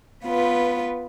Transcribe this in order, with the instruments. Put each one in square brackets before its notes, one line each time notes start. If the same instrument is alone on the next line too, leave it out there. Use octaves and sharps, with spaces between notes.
[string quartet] B3 F4 B4